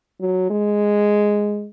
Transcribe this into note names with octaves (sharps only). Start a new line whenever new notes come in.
F#3
G#3